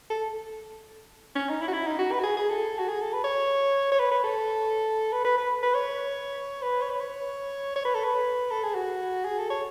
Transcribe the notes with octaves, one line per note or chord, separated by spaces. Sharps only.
A4
C#4
D#4
E4
F#4
E4
D#4
F#4
B4
F#4
G#4
G#4
A4
F#4
G#4
A4
B4
C#5
C#5
B4
B4
A4
B4
B4
B4
B4
C#5
B4
C#5
B4
C#5
C#5
B4
A4
B4
A4
G#4
F#4
G#4
A4
C#5